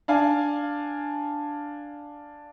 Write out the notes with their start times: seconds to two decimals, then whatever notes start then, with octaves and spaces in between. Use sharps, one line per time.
0.08 D4 F5 G#5